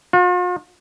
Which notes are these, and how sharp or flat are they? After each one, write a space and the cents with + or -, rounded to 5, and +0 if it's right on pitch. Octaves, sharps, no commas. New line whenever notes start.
F4 +45